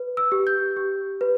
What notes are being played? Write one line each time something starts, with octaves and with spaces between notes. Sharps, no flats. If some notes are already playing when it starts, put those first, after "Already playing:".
Already playing: B4
E6
G4
G6
G4
B4